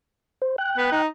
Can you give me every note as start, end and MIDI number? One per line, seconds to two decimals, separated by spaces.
0.42 0.56 72
0.58 1.02 79
0.58 1.02 90
0.77 0.87 59
0.92 1.06 63